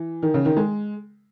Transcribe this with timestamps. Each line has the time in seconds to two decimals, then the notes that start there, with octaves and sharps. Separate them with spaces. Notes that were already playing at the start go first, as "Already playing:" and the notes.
Already playing: E3
0.22 D#3
0.34 C#3
0.45 D#3
0.57 G#3